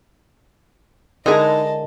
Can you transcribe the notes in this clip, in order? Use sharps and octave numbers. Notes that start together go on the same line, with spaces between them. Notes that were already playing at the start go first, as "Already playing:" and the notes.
D3 G#3 D#4 E4 G#4 A#4 D#5 A5